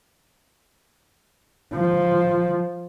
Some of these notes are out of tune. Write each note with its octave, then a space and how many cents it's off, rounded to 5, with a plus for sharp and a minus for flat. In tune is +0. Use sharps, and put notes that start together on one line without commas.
F3 +0